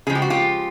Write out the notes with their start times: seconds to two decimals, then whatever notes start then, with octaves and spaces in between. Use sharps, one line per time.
0.07 C#3 G#4
0.09 F3 G#3
0.15 G4
0.22 F#4
0.30 F4 G4